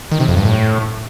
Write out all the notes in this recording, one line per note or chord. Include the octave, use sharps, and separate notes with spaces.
D#3
C3
F2
G2
A2